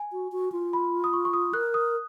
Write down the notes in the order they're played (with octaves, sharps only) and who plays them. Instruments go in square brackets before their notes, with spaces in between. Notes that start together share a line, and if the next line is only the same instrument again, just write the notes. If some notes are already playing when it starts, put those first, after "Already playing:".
Already playing: [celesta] G#5
[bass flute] F#4
F#4
F4
[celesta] B5
D#6
C#6
C#6
D#6
[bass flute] A#4 [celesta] F#6
[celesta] D#6